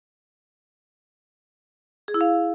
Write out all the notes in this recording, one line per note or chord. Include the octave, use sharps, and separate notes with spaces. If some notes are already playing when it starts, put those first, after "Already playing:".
G#4
E4
F5